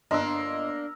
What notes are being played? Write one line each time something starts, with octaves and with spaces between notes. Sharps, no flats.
G1 A#3 D4 A#4 D#5 C6 E6